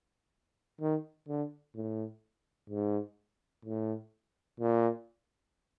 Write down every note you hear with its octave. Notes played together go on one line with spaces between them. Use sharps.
D#3
D3
A2
G#2
A2
A#2